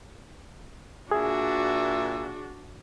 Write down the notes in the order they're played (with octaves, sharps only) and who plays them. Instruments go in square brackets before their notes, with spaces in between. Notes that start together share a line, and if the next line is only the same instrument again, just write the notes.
[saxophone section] A#2 E5 [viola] D4 F#4 [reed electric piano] G#4